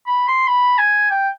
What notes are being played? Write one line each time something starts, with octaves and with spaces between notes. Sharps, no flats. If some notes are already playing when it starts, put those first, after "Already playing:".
B5
C6
B5
G#5
G5